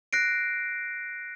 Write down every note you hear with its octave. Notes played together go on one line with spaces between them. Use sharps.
F#6 A#6 C7 D7